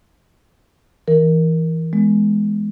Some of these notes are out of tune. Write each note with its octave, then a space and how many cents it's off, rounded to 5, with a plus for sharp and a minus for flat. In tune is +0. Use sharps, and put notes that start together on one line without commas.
E3 -15 A#4 +0
G#3 +0 B3 +0